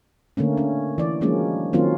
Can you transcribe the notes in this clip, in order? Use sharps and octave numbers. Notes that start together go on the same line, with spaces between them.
D3 A3 A#3 C#4
C#4
E3 D5
F3 F#3 G#3 A#3 C#4 D4
D#3 F#3 A#3 C4 C#4 F4